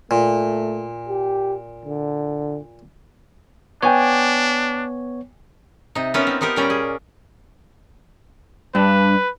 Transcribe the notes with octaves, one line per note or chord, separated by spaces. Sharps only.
A#2 A3
G4
D3
B3 D4 C#5 G5 G#5 D6
C3 D#4
B3 C#4 D#4 F4 A#4 E5
C4
B3 D#4 G4 A#4
A#2 G3 A#3 C#4 D5 A#5
G#4
G2 D4 B4